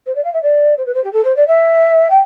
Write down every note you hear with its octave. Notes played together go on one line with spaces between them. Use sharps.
C5
D5
F5
E5
D5
C5
B4
C5
G4
A4
C5
D5
E5
G5